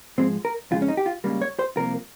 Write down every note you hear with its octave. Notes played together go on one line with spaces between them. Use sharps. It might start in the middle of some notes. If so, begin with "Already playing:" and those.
G#2 F3 G#3 C4
A#4
F2 C#3 G#3 F4
C#4
D#4
G4
F4
C#2 C#3 G3 A#3
C#5
C5
C2 C3 F3 A#3 A#4